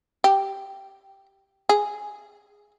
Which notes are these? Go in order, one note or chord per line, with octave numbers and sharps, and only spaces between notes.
G4
G#4